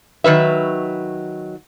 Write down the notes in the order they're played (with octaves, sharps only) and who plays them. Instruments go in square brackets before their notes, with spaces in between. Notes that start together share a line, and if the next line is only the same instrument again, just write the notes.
[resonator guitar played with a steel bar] D#3 F#3 B4 E5